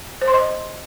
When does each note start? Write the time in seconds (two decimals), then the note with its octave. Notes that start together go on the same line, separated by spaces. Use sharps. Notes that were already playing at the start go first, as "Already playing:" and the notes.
0.22 C5
0.28 C6
0.34 D#5